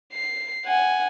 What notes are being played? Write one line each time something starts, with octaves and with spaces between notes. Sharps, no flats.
C7
F#5 G#5